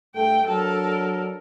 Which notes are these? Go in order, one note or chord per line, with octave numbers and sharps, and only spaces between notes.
G2 A3 A4 G5
F#3 D4 A4 A#4